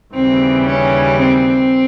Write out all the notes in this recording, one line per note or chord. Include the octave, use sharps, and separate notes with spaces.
D#2 C#3 E3 G3 C4
C#4
C4